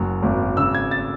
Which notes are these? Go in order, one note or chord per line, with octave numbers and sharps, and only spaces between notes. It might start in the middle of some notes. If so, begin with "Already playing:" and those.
Already playing: F#1 F#3
G#1
C#3 E6
G#6
A6